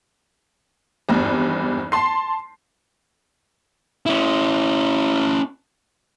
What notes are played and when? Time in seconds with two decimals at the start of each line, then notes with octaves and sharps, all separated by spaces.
1.09 G#1 E2 G2
1.92 A5 C6 C7
4.06 C#4 E4